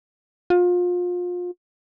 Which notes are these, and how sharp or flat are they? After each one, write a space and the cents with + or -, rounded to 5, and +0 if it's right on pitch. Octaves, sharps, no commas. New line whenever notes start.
F4 +30